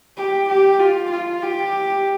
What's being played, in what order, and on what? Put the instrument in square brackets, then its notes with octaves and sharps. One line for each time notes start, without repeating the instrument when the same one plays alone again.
[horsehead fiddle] G4
G4
F4
F4
G4